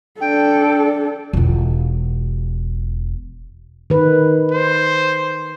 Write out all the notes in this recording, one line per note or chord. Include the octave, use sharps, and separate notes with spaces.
D4 A4 G5
E1 F4
D#3 B4
C5